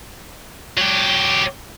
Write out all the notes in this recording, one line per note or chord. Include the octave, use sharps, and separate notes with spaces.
F#3 G4